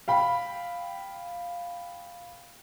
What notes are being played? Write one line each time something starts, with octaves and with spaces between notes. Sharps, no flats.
F5 G5 B5